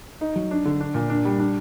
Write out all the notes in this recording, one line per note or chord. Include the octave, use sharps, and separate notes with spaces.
D#4
F#3
D4
D3
D4
A#2
D4
G3
D4